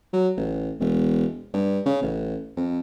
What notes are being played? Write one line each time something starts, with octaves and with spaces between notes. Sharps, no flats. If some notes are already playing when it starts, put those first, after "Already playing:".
F#3
A1
E1
G2
C#3
A1
F2